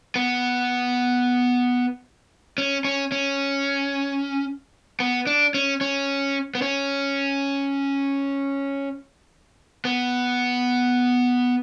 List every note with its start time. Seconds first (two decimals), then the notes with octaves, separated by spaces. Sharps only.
0.16 B3
2.58 C#4
2.85 C#4
3.12 C#4
5.00 B3
5.27 D4
5.54 C#4
5.81 C#4
6.55 B3
6.62 C#4
9.85 B3